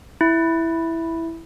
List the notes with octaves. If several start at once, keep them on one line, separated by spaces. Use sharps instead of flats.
E4